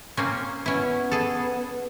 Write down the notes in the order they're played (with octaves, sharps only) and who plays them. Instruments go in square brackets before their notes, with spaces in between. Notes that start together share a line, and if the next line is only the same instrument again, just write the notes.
[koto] A#3 C4 C#4
[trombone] B3 [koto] C#4 E4
[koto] G#4 A4